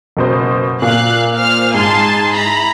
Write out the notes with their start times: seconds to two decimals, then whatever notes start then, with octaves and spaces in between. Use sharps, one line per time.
0.17 F#1 B2 C5
0.82 A#2 F5 F#6
1.37 C5 F5 F6
1.74 G#2 G#5 A5 C6
2.34 E4 A#5 B5